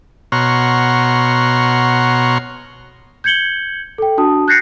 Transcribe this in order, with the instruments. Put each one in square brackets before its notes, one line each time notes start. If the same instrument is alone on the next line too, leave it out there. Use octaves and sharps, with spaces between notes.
[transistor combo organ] B2 C#5 F#5 A#5 C6 F6
[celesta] G6 G#6 C#7 F#7 G7
A4 G5
D4 F#4 A5 D#6
F#6 G6 A6 A#6 C7 C#7